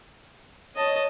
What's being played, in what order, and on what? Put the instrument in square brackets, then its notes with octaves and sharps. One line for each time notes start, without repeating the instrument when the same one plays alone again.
[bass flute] C#5 [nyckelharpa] D#5 A5